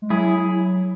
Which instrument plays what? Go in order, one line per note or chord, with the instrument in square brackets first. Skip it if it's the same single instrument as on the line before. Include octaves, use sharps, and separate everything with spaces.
[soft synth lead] G#3
[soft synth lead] F#3 [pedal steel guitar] E4 G#4